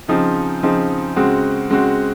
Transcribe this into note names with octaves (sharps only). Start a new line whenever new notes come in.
C#3 F3 C4 D#4 G#4
C#3 F3 C4 D#4 G#4
C#3 G#3 C4 F#4
C#3 G#3 C4 F#4